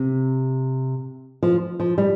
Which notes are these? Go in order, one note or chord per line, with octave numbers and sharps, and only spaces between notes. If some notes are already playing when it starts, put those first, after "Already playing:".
Already playing: C3
F3
F3
G3